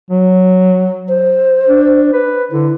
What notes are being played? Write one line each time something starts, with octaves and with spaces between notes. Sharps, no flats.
F#3
C5
D4
B4
D3 E4